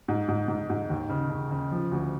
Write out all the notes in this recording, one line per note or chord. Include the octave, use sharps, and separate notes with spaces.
G#2
G#2
G#2
G#2
D#2
C#3
C#3
C#3
F3
D2